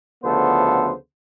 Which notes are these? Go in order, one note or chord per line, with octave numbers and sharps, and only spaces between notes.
D2 C#3 F3 B3 A4 C5